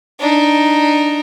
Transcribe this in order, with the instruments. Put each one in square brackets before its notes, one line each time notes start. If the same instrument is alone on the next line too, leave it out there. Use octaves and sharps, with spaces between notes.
[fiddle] D4 D#4